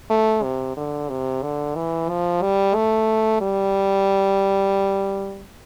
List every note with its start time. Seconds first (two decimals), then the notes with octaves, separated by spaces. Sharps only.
0.10 A3
0.43 C3
0.77 D3
1.10 C3
1.43 D3
1.75 E3
2.09 F3
2.42 G3
2.75 A3
3.41 G3